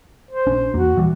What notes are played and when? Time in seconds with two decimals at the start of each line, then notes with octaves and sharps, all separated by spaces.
0.31 C5
0.46 A#1 C#4 D4
0.74 E2 A#3 F#4
0.96 D#1 E3 G3